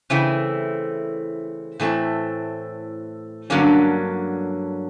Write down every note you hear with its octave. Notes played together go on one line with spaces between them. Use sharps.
C#3 E3 A3 C4 E4
A2 E3 A3 C4 E4
G2 D3 F#3 A#3 C#4